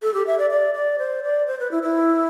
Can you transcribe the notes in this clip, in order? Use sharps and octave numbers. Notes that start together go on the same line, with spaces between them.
A4
G4
E5
D5
D5
D5
C5
D5
C5
B4
E4
E4